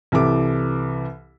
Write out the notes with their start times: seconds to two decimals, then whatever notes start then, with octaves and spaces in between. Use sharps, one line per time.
0.12 C2 E3 A4 D6